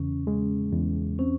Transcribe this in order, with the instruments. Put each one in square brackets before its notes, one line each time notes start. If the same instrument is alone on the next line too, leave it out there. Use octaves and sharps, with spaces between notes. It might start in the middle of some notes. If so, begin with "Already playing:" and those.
Already playing: [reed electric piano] E2 C#3 [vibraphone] C#4
[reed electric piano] G#3
E2
[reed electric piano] C4 [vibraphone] C#4